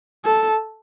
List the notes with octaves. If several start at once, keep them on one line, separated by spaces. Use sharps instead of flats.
A4